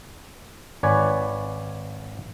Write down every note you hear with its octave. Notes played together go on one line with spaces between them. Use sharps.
G#1 B4 C#5 D5 G#5